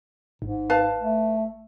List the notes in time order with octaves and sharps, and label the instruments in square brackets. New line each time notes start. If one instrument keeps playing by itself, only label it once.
[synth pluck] G#1 [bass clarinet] G#2
[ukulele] B4 F5 A5
[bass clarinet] A3